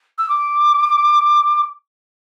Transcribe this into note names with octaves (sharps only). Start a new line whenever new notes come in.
E6
D6